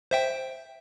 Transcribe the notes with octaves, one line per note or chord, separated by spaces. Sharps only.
C5 E5 G5